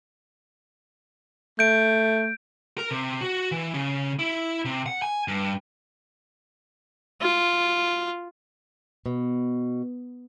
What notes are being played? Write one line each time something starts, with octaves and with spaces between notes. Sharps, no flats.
A3 G6 D7
A#4
C3
F#4
E3
C#3
E4
C3
F#5
G#5
G2
F4
B2